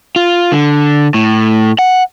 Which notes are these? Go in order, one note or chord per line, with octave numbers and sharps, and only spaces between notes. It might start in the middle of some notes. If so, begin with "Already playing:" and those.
F4
D3
A2
F#5